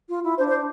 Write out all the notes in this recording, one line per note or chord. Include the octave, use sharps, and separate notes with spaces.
F4
E4
D4 C5
C5